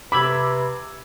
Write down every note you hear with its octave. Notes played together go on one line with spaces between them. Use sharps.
C3 B4 B5 D6 E6 G#6